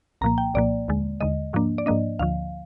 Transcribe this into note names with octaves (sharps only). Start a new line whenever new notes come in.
C2 A#2 F3 A#3 A#5
G5
C2 A#2 F3 A#3 D5
D#2 D3 G#3
D#2 D3 G#3 D#5
G#2 F3 A#3 D4
D5
G#2 F3 A#3 D4 D#5
D2 D3 F3 F5